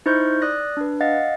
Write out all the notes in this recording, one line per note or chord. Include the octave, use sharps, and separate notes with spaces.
D#4 E4 C5 C#6 F6 G6
D5 D#6 F#6 A#6
D4 B4
D#5 F5 F#5 A6